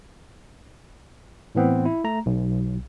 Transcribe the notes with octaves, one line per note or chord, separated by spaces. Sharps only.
A2 E3 B3 C4
E4
A3 A#5
B1